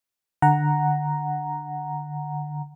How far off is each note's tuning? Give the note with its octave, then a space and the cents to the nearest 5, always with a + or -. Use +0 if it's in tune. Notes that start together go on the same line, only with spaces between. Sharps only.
D3 +20 F#5 +0 A#5 +0